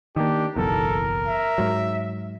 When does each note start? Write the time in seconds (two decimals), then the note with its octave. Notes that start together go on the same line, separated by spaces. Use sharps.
0.16 D#3 A#3 D4 G4
0.56 F#1 B1 E2 A4 A#4
1.26 E5
1.58 G#2 F#3